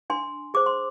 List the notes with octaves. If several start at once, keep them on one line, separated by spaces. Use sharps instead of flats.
D4 G#5 C6
G#4 C5 D6
C6